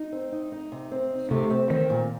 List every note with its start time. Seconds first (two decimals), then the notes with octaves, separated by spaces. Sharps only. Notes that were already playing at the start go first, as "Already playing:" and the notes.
Already playing: D#4
0.12 C4
0.32 D#4
0.52 D#4
0.72 C3
0.91 C4
1.10 D#4
1.30 C3 A3
1.50 C4
1.70 D#3 C4
1.90 A#2